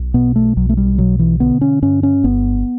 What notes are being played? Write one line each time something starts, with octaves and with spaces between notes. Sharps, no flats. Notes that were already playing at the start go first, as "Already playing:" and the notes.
Already playing: B1
B2 B3
A3
B1 F#3
A3
G3
B2 F#3
E3
D3 B3
C#4
G2 C#4
C#4
G1 B3